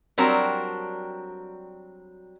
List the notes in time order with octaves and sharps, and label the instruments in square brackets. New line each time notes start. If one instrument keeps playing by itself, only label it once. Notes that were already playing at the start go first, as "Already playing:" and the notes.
[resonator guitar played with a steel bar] F#3 G3 C4 D4 F#4 A#4